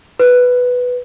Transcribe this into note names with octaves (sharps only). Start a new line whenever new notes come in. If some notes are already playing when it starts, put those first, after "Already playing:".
B4